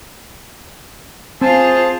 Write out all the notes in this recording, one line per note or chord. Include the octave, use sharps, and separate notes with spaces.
C4 F4 G#4 C5 A5